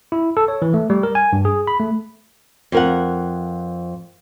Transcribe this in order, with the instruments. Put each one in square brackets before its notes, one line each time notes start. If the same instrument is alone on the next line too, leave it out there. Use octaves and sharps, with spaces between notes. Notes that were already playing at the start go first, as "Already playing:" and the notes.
[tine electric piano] E4
A4
C#5
E3
A3
G3
A#4
G#5
G2
G#4
B5
A3
[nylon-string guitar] F2 A#4 F#5